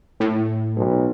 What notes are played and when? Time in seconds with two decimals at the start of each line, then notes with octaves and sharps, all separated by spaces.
0.20 A2
0.77 B1